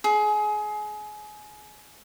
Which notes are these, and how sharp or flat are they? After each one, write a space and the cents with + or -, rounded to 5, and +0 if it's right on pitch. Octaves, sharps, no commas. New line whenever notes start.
G#4 +25